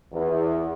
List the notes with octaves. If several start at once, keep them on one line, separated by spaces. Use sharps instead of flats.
E2